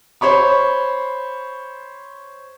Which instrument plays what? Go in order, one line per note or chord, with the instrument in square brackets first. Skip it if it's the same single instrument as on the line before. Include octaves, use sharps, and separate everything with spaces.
[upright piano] C5 C#5 B5 C#6